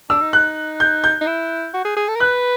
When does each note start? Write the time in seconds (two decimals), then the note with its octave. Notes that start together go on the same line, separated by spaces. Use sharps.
0.10 D4 E6
0.21 D#4
0.33 F#6
0.80 G6
1.04 G6
1.21 D#4
1.27 E4
1.74 F#4
1.85 G#4
1.97 G#4
2.09 A4
2.16 A#4
2.20 B4 F#6